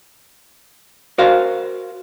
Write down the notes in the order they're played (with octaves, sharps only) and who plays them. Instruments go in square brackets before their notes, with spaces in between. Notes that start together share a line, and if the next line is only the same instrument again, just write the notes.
[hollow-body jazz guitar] F#4 A#4 C5 F5